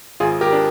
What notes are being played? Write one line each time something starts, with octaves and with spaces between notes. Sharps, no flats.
G#1 F4 G#4
G4 A#4
D4